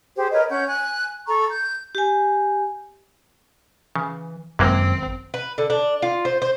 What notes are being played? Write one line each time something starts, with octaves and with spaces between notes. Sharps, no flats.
G4 G#4 C5
A#4 B4 C#5 D#5
C#4 C#5 F#5 G6
G#5 F#6
A4 A#5 C#6
G6
G4 G#5
C#3 E3
G#1 F#2 C3 E3 G#3 A#3 C4
B4
D3
D4
F4
C5
C5